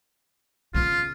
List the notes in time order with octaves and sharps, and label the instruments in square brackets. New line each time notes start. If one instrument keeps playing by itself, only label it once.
[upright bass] C#3 B3 [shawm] F4